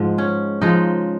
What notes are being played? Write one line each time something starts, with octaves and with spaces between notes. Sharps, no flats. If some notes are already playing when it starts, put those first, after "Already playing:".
Already playing: G#2 F3 G#3
C#4
C#3 F3 G#3 D#4